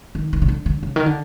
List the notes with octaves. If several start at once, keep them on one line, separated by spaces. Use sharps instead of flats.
D#3
D#3
C#3
D3
D3
C#3
D#3
D3